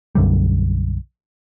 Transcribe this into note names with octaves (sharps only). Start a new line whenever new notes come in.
B1 F#2 D3 G3